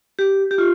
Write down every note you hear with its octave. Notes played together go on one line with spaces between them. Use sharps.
G4
G4
F4